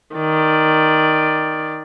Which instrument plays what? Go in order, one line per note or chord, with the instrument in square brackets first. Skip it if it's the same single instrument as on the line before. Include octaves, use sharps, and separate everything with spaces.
[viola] D#3 D5